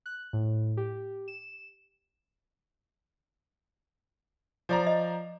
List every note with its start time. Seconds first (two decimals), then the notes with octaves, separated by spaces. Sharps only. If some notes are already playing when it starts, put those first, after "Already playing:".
0.06 F#6
0.33 A2
0.77 G4
1.28 E7
4.69 F3 D5 A#5
4.87 D#5